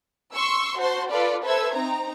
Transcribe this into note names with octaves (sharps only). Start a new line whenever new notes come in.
C6 C#6 E6
F#4 C5 A5 C6
F4 A4 B4 D5 F5
A4 B4 C5 E5 E6 G#6
C4 D#4 A#5